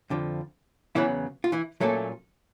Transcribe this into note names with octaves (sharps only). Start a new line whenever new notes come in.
F2 D3 F3
E2 C#3 E3 F#3 B3 E4
F4
E3 E4
A#2 F#3 A3 A#3 C#4 A4